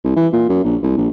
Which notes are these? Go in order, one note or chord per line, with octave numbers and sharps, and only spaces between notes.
C2
E3
A#2
F#2
A#1
C2
A#1